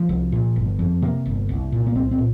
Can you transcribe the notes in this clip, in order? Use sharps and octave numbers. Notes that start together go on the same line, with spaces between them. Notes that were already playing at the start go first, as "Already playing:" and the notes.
Already playing: F3
C2
A#2
G1
F2
C3 A#3
G1
C2
A#2
A#3
C2 C4
C4
A#2